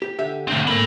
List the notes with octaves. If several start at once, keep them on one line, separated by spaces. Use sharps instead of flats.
G4
D3 G4 E5
D3 A3 C4 D4
G#3 A#3 A4 B5